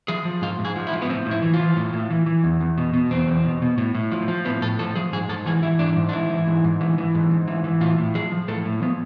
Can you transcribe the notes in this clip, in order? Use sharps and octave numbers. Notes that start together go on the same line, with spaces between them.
F3 G#4
F3
G#2 F4
G#2
G#4
F3
E4
F3
B3
A2 C4
A2 E4
E3
F4
E3
A2
A2
E3
E3
E2
E2
B2
B2
E2 C4
E2
B2
B2
A2
A2
F3
F3
A2 B3
A2 A4
F3 A4
F3 G#4
G#2 G#4
G#2 A4
E3 G#4
E3 E4
G#2 D4
G#2
D4
E3 E4
E3
G#2
G#2
E3
E3
G#2
G#2
E3
E3
A2 F4
A2
F3 G#4
F3
A2 A4
A2
F3 B3